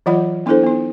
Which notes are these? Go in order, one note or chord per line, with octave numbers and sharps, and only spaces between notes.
E3 F#3 F4 D5 F#5 B5
B3 D4 E4 G#4 A4 C5
B3 D#4